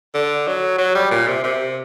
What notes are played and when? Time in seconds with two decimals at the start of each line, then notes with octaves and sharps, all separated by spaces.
0.15 D3
0.47 F#3
0.79 F#3
0.95 G3
1.11 A#2
1.27 C3
1.44 C3